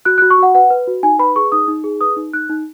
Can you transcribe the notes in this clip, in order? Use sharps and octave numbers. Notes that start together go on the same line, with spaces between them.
F#4 F#6
F#6
F#4
C#6
F#4 F#5
B4 F#5
B4
F#4
D#4 G#5
B4 B5
G#4 C#6
D#4 D#6
D#4
G#4
B4 D#6
D#4
D#4 F#6
D#4